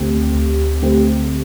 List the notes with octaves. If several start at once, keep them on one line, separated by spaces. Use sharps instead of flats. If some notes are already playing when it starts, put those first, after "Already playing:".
Already playing: D2 D3 A3 C4 G4
D2
D3 A3 C4 G4